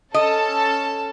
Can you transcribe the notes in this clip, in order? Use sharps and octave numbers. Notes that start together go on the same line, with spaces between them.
C#4 A4 D#5 A5